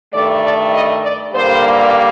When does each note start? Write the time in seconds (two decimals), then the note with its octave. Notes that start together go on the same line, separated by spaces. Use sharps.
0.13 G2 D#3 A3 D5
0.43 D5
0.74 D#5
1.04 D5
1.33 G2 D3 G3 A#3 C5